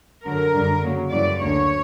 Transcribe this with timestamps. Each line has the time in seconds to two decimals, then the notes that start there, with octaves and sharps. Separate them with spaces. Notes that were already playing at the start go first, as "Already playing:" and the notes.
0.25 F#2 D3 F#3 A#4
0.54 F#2 D3 G3
0.84 C#3 F#3 A#3
1.12 F#2 C#3 E3 G3 D5
1.41 D2 D3 A#3 C#4 C#5